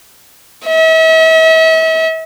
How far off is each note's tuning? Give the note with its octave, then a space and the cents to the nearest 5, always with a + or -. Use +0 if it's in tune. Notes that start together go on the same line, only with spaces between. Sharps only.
E5 -40